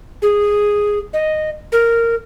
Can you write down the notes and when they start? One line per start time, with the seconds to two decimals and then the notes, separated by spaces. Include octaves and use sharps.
0.22 G#4
1.13 D#5
1.72 A#4